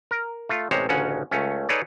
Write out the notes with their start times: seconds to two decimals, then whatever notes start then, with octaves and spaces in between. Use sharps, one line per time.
0.11 A#4
0.49 A3 F4
0.71 A1 C3 G#3 C5 C#5
0.89 A1 D2 C#3 C#4 F#5
1.31 C#2 A3 C#4
1.69 D#4 G#4 A4 B4 C#5 D5